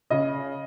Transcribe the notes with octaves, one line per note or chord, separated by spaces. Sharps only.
C#3 D#5